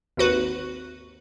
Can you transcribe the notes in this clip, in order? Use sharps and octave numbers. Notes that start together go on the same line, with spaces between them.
G#1 D#2 F#4 B4